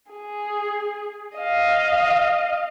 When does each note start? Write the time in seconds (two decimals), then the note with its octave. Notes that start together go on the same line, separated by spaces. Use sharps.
0.12 G#4
1.38 D#5 F5